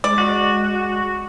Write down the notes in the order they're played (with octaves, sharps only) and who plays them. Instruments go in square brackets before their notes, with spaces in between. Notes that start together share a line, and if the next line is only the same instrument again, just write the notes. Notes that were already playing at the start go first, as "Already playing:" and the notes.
[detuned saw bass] G#3 [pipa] D5
[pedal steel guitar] F#4